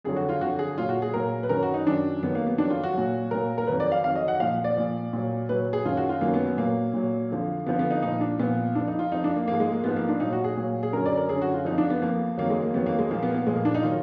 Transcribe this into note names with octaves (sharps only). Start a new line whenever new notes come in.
F2 D3 F#3 G#4
F#4
F4
F2 D3 F#3 F#4
G#4
A#2 F#3 F4
F#4
G#4
A#2 F#3 A#4
B4
F#2 D#3 F#3 A#4
F#4
D#4
F#2 D#3 F#3 D4
F2 D#3 F#3 B3
A#3
B3
F2 D#3 F#3 D4
F4
F#4
A#2 F#3
A#2 F#3 A#4
A#4
F2 D#3 F#3 B4
D5
F5
F2 D#3 F#3 F5
D#5
F#5
A#2 F3 F5
D5
A#2 F3
A#2 F#3
A#2 F#3 B4
G#4
F#2 D#3 F#3 F4
F#4
F4
F#2 D#3 F#3 A#3
B3
B3
A#2 F#3 A#3
A#2 F#3
F2 D3 F3
F2 D3 F3 B3
B3
D#4
A#2 F3 D#4
D4
A#2 F3 B3
F2 F3 D4
D#4
F4
F2 F3 D#4
D4
A#3
G#2 F3 A#3
G#3
A#3
G#2 F3 B3
A#3
D4
A#2 F#3 D#4
F#4
G#4
A#2 F#3
G#4
F#2 D3 F#3 A#4
D5
A#4
F#2 D3 F#3 G#4
F#4
F4
F2 F3 D#4
D4
B3
F2 F3 A#3
F2 D#3 F#3 A#3
G#3
A#3
F2 D#3 F#3 B3
A#3
G#3
A#2 F3 A#3
B3
A#3
B3
A#2 F3 G#3
A#3
D4
D#4
D#3 F#3 F4